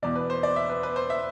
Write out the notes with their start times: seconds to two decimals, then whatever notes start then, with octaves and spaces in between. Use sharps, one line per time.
0.02 E2 B2 D5
0.16 B4
0.30 C5
0.43 D5
0.56 E5
0.69 B4
0.83 B4
0.96 C5
1.10 E5